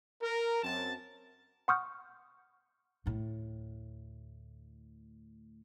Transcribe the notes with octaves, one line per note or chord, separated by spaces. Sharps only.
A#4
F#2 C4 A5
F#5 C6 C#6 D#6 F6 G6
D2 A2